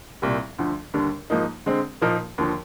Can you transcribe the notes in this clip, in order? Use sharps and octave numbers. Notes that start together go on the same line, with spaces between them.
C2 A#2 G3
D2 D3 F3
D#2 D3 G3 D4
G#2 F3 A#3 D#4
D3 G#3 C4
A#2 F3 A#3 D#4 A#4
D#2 D3 F3